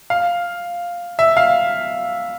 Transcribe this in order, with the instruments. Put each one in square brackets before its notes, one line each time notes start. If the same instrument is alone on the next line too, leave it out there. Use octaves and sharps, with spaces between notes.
[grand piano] F5
E5
F5